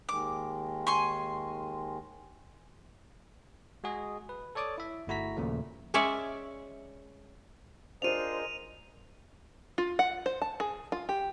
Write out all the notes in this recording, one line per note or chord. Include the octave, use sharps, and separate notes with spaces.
D#2 D#3 G#3 D6
G#5 C6 C#6
G#3 F#4 G#4 D#5
B4
A4 C#5 D5 D6 D#6
E4 E5
G1 A3 E4 F#4 A#5 B6
D#2 A#2 C#3 F3 A3
G#3 C#4 C#5 D5 E5
D4 F4 G#4 A#4 C5 D#5 D#7 F7
F4
F#5
C5
A5
G#4
F4
G4